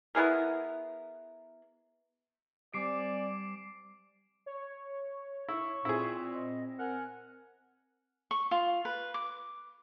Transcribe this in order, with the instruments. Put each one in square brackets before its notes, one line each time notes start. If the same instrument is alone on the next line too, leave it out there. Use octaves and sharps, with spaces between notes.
[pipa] B3 E4 G#4 A#4
[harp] G3 G4 [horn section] C4 D5 G#5 [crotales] D6 C7 D7
[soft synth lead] C#5
[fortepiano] E4 [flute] C#6
[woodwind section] A#2 [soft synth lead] C4 [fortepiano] E4 G#4
[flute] D#5
[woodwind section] A#4 F#5 [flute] G#5
[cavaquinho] C#6
F4
B4
D6